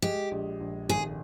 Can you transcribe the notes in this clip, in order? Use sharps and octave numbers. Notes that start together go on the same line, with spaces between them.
G#3 G4
A#1
A#1
G#1 G#4